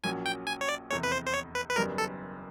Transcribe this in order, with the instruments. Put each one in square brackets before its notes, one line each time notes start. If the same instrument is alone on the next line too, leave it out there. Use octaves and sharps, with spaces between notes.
[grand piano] A#1 A#2 F#3 A#3 C#4 [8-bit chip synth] G#5
[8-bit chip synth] G5
G#5
C#5
D5
[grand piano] F1 E2 C3 [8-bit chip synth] C#5
[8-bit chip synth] B4
C5
C5
C#5
B4
B4
[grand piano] F#1 F#2 D#3 G3 B3 [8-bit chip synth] A#4
[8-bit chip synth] A4